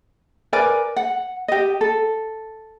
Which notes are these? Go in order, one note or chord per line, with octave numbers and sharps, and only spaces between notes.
A#4 B4 D5 G#5
F#5
G4 D#5
A4